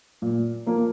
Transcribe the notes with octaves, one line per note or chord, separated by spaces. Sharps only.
A#2
F3 A#3